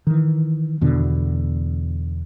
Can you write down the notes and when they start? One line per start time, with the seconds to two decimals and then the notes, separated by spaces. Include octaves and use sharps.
0.07 D#3 E3
0.81 E2 B2 D3